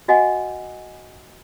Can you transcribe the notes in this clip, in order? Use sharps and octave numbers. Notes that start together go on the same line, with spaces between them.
F#4 D#5 F#5 G#5